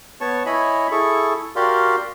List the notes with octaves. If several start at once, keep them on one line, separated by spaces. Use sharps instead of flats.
B3 C#5 A5 C#6
E4 C#5 D#5 G#5 B5
E4 G#4 A4 C#6
F#4 G4 A#4 D5 F5 C6